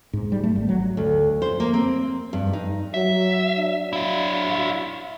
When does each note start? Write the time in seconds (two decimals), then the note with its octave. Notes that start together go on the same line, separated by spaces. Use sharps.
0.13 G#2
0.32 G3
0.43 A3
0.56 G#1
0.69 F#3
0.97 D2
1.42 C5
1.60 A#3
1.74 C4
2.33 G2
2.53 D#4
2.94 F#3 E5
3.56 F#3 D4
3.93 E4 F5